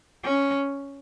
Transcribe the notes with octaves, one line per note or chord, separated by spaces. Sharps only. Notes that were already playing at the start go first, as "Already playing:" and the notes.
C#4